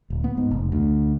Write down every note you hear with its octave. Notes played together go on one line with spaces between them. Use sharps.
D1
B3
G#2
F1
D2